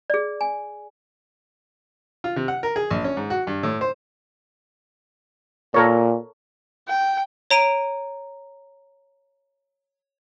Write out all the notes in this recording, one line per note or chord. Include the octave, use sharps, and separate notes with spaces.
G#4 D5
G#5
F4
C3
F#5
A#4
G#4
A#1
C#4
G#2
F#4
G2
A2
C5
A#2 A4 A#4 C#5
G5
C#5 A#5 D7 D#7